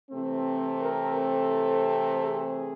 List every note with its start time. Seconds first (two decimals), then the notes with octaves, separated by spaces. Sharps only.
0.11 C3 E3 A3 C4
0.82 A#4
1.18 A4
2.24 G#4